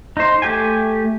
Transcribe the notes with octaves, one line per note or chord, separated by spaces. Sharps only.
D#4 C5
A3 G4 G5 G#5